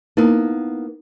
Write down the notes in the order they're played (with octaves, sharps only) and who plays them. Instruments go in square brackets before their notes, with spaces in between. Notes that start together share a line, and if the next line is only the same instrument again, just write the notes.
[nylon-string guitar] A#3 B3 [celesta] D#4 E4 A#4